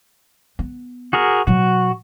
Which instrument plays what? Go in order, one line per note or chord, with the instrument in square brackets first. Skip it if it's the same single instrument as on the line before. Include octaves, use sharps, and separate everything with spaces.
[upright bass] B3
[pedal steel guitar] F#4 G#4 A#4
[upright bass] B2 F#3 [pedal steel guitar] F#4